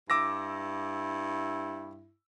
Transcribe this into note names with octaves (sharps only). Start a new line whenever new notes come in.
G2 E4 D6 E6 A#6